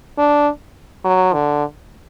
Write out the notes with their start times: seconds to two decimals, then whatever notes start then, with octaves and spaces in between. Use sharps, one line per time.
0.18 D4
1.05 F#3
1.34 D3